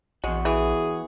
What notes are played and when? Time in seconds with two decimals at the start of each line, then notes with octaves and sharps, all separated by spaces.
0.24 A#1 E2 G#3 F#4
0.45 E3 G#4